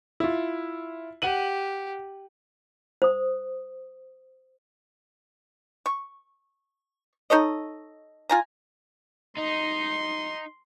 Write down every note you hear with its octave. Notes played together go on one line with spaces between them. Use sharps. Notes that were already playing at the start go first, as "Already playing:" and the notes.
E4 F4
G4 F#5 D#7 F#7
C5 D#6
C#6
D#4 A4 C#5 D#5
F4 G#5 A#5
D#4 C6